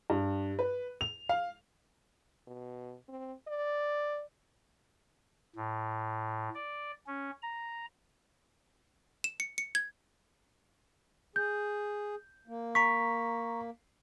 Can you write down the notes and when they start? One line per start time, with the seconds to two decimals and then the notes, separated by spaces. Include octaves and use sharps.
0.10 G2
0.59 B4
1.01 F7
1.29 F5
2.48 B2
3.08 C4
3.48 D5
5.56 A2
6.55 D5
7.07 C#4
7.42 A#5
9.24 E7
9.40 C#7
9.58 C#7
9.75 G#6
11.36 G#4 G6
12.47 A#3
12.75 A#5 C#6 B6